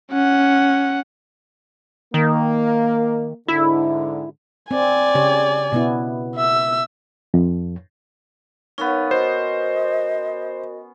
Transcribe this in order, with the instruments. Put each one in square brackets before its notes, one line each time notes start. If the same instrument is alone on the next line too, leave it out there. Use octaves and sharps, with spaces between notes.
[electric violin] C#4 F#5
[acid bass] D#3 [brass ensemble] A#3
[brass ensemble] G#2 D3 [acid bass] E4
[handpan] C4 [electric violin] D5 G#5
[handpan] C#3 G4 C#5
B2 B3 E4
[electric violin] E5 E6
[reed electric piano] F2
[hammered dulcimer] B3 C#4 [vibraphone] D#4 A#4 F5
[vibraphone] F#4 A#4 [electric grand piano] C5 [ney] D#5